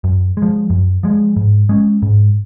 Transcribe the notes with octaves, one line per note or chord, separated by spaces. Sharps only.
F#2
G#3
F3
F#2
F3 G#3
G#2
G#3 C#4
G#2